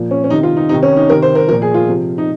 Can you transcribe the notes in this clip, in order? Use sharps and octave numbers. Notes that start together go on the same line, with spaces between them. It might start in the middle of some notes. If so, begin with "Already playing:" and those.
Already playing: A#2 F3
C#4
C#4
C3 D#3 D#4
F4
D#4
C3 D#3 D#4
C#4
D#4
C3 D#3 A#4
C5
A#4
A#2 F3 A#4
G#4
F4
C3 F3
D#4